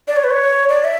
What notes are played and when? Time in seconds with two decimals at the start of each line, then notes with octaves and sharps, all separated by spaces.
0.08 D5
0.16 C#5
0.24 B4
0.31 C#5
0.69 D5
0.84 E5